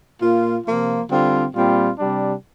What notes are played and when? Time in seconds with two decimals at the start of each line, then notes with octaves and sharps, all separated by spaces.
0.22 A#2 A#3 F4
0.67 C3 F3 A#3 F4
1.10 D3 G3 C4 F4
1.55 A#2 G3 C4 F4
1.99 C3 G3 D4